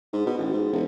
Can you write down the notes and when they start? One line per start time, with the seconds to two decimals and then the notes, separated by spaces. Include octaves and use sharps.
0.13 G#2
0.26 B2
0.38 A1
0.53 G#2
0.73 E1